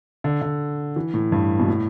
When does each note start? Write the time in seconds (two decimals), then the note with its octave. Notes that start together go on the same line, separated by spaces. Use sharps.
0.24 D3
0.42 D3
0.96 E3
1.14 A2
1.32 G2
1.60 B2
1.68 A2